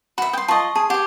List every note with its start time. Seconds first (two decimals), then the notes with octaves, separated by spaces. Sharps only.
0.18 F#4 E5 B5
0.33 G5 C6 D#6
0.48 F4 D#5 A5 C6 C#6
0.76 G#4 A5
0.90 G4 C#5 F#5